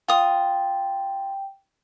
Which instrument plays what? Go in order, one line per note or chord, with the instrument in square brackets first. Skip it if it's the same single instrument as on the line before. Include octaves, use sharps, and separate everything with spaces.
[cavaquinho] F4 D#6 [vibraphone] G5